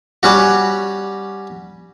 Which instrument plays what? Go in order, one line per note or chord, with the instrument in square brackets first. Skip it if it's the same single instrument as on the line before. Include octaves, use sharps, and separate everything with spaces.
[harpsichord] G3 C#4 F#4